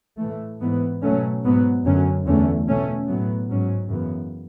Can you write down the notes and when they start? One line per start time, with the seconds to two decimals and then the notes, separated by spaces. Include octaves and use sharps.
0.19 A2 E3 A3
0.61 G#2 E3 B3
1.01 B2 F#3 A3 C#4
1.44 G#2 F#3 B3
1.84 F#2 D3 F#3 C#4
2.25 E2 D3 A3 C#4
2.68 B2 A3 C#4
3.08 A2 F#3 B3
3.50 G#2 F#3 C#4
3.91 F#2 C#3 E3 B3